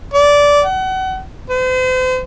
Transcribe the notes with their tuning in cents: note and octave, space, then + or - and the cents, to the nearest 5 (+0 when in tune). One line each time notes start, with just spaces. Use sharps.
D5 -15
F#5 +30
C5 -40